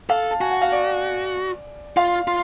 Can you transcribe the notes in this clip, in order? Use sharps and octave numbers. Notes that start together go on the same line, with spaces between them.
A4 F5
A5
F#4 G#5
F#5
F5
D5
F4 F5
F4